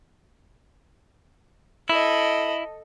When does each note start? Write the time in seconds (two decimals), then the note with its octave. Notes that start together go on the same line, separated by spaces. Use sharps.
1.90 E4 A4 D#5